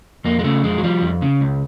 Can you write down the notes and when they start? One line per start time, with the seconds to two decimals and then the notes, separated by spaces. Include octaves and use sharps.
0.25 F2 A#3
0.39 G#3
0.44 C#3 A3
0.63 F2 G#3
0.78 F#3
0.84 F3 G3
1.02 F2
1.22 C#3
1.41 C#2